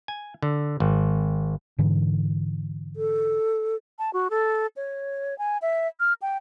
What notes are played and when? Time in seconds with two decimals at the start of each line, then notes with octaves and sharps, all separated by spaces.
0.08 G#5
0.42 D3
0.80 G#1
1.78 G#2 D3 E3
2.96 A4
3.99 A5
4.13 F#4
4.30 A4
4.76 C#5
5.38 G#5
5.62 E5
6.00 F6
6.22 G5